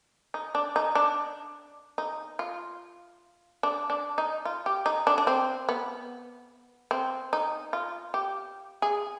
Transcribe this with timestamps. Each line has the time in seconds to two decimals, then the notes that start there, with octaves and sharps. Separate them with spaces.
0.34 D#4
0.55 D4
0.76 D#4
0.95 D4
1.98 D#4
2.39 F4
3.63 D4
3.90 D4
4.18 D#4
4.45 F4
4.66 G4
4.86 D#4
5.07 D4
5.18 D4
5.27 C4
5.69 B3
6.91 C4
7.33 D#4
7.73 F4
8.14 G4
8.82 G#4